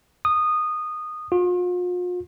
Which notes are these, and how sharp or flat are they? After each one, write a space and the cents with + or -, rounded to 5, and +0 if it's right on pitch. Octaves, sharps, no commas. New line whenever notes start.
D#6 -15
F4 +40